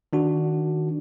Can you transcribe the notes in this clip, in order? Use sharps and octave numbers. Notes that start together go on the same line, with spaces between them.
D#3 D4 F#4